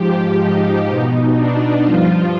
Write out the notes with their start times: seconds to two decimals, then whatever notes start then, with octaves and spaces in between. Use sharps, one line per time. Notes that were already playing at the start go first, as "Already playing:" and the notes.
Already playing: G#2 F3 G4
0.41 D#4
0.88 B2
1.36 D4
1.84 G2 F3 F4